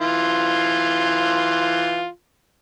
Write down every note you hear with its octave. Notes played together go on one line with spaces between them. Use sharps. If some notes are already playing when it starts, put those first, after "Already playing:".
E3 F4 C6